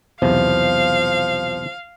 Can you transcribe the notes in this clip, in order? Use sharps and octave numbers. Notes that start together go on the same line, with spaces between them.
B1 E2 C3 F3 F5